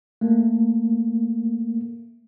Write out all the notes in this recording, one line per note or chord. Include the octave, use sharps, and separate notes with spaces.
A3 A#3